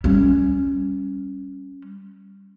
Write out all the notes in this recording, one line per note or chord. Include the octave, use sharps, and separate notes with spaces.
G3 C#4